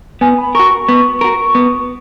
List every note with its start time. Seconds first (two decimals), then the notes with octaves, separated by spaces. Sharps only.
0.21 B3 G#5
0.38 B5
0.55 F#4 A#4 C#6
0.71 C#6
0.89 B3
1.21 F#4 A#4
1.55 B3